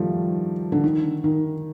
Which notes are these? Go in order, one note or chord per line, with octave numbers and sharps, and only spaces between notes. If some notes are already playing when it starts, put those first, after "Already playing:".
Already playing: D#3 F3 G3 A3
D3
D#3
D#3